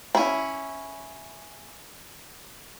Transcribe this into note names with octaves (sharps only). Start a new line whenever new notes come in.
C#4 E4